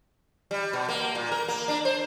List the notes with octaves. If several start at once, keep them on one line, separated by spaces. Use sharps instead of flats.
G3
B2
A#3
A#2
A#4
A#3
D4
C5